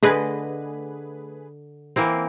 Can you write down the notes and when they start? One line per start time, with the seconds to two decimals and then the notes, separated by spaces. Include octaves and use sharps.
0.03 D3 A3 G#4 B4 D#5
1.96 E3 A#3 C4